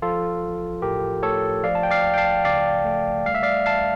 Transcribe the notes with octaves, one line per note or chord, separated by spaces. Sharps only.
F3 F4 A4
A1
A2 G4 A#4
A3 A4 C#5
F3 D5 F5
A5
G5
D5 F5
C#2
G5
F5 A5
C#3 D5 F5
A3
G3 F5
E5
D5 F5
A1 F5 A5